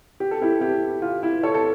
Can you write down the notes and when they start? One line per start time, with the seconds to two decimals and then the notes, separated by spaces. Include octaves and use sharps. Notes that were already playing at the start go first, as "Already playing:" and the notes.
0.20 G4
0.31 A4
0.42 E4 G4
0.61 E4 G4
1.02 F4
1.23 E4
1.43 A4 C#5
1.54 A4